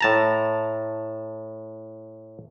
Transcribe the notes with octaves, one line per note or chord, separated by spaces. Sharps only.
A2 A5 A#5